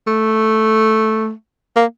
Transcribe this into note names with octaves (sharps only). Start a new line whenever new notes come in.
A3
A#3